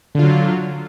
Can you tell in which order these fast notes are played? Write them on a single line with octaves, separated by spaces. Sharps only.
D3 F4 F#3